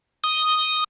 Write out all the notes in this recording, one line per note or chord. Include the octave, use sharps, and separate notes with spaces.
D#6